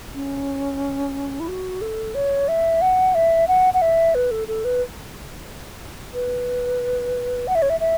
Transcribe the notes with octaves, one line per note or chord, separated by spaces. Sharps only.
C#4
E4
F#4
A4
C#5
E5
F#5
E5
F#5
F#5
E5
B4
A4
A4
B4
B4
F#5
E5
C#5
E5
E5